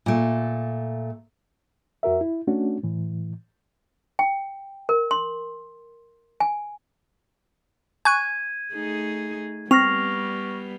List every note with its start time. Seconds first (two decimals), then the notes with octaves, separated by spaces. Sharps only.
0.06 A#2 A3
2.03 F2 F#4 A#4 E5
2.21 E4
2.47 A3 C#4 D4 F#4
2.83 A2 E3
4.19 G5
4.89 A#4
5.11 C6
6.40 G#5
8.05 G#5 C#6 F#6 G#6 D#7
8.74 A3 D#4 G#4
9.71 G3 B3 C4 C#6 F6 A#6 C7 F7